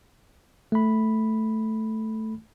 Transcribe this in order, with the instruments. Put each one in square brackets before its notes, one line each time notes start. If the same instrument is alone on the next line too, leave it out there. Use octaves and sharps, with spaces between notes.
[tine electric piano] A3 B5